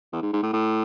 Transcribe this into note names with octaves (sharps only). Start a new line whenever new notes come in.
E2
G#2
G#2
A2
A2